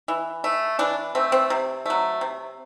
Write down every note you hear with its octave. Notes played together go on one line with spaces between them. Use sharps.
E3
A3
E3 D4
A3 C4
C4
C3
F#3 A3
C3